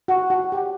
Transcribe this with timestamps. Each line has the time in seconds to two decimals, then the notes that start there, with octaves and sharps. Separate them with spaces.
0.08 F#4
0.30 F#4
0.52 G4